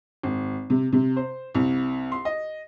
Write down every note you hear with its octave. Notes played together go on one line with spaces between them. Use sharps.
G#1
C3
C3
C5
C2
C6
D#5